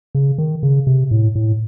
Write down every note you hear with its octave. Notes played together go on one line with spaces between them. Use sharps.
C#3
D#3
C#3
C3
A2
A2